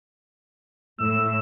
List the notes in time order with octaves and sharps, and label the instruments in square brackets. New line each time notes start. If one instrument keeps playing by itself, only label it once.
[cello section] A2 [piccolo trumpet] E6